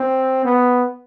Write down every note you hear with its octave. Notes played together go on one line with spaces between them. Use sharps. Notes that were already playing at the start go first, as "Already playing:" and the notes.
Already playing: C4
B3